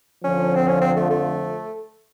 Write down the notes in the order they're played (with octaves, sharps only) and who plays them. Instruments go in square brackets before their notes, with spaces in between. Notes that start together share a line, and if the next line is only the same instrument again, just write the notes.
[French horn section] F2 D3 F3 [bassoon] C#4
[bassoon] C4
C#4
C4
A3
A3